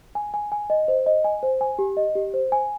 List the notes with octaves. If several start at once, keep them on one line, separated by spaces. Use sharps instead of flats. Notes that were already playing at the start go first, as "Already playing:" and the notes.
G#5
G#5
G#5
D#5
C5
D#5
G#5
C5
G#5
G4
D#5
G4
C5
G#5